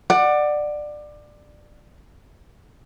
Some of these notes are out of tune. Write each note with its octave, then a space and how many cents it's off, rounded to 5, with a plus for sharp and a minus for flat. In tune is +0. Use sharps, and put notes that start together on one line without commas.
D5 +20 F#5 +0